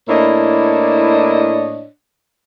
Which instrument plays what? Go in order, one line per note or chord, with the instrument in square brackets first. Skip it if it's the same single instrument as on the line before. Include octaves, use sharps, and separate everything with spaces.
[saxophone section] A2 A#3 D4 E4 C#5 D#5